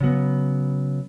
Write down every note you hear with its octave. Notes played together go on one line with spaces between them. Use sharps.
C#3 F#3 B3